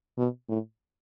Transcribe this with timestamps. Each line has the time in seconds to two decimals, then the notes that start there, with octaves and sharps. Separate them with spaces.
0.17 B2
0.48 A2